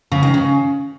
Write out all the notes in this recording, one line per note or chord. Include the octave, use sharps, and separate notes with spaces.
C#3
D#3
C#3